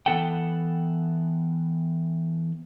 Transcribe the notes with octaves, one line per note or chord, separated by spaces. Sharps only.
E3 G3 B3 A4 F#5 G5